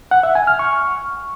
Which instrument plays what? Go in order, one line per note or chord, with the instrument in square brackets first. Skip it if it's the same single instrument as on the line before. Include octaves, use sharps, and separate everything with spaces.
[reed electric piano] F#5
E5
G#5
F6
C#6